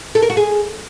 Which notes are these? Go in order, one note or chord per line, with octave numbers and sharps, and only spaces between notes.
A4
A#4
F#4
G#4